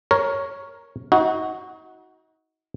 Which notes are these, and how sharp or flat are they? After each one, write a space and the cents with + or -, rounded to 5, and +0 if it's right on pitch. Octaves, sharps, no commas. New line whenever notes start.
A#4 +5 C#5 +0
D#4 +35 F#4 +0